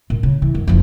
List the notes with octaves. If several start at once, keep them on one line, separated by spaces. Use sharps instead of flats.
A#2
C#3
E3
F#2
F#1 F3